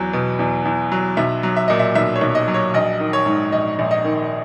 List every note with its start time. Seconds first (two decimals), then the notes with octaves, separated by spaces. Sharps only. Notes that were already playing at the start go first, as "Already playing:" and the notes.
Already playing: E2 F#3
0.13 B2
0.39 E2
0.65 E2
0.92 F#3
1.17 B1 E5
1.43 F#3
1.56 E5
1.68 A#2 D#5
1.79 E5
1.95 B1 E5
2.16 C#5
2.21 B1
2.35 D#5
2.48 F#3
2.54 C#5
2.74 A#1 D#5
3.00 D#3
3.13 C#5
3.26 G#2
3.52 A#1 D#5
3.79 A#1
3.91 D#5
4.04 D#3